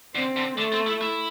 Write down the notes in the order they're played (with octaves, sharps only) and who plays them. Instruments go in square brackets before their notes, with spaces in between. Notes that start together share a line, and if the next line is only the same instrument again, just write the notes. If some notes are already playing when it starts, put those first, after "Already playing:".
[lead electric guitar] D3 [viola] C4
[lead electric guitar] D3
[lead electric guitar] D3 [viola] A3
[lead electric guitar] C4
E4
E4